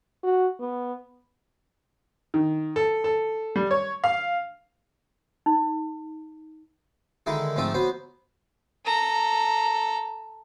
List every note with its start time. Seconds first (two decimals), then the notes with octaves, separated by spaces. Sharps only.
0.23 F#4
0.60 B3
2.34 D#3
2.76 A4
3.04 A4
3.56 G3
3.71 C#5
4.04 F5
5.46 D#4
7.26 D3 D#3 G#3 E4 G#4
7.56 G#2 F3 A3 C4 E5 D#6
7.74 F#3 B3 C5
8.85 A4 A#5